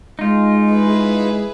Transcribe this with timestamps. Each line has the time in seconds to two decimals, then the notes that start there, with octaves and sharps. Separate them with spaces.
0.19 G#3 D#4 F4
0.71 E3 G#4 B4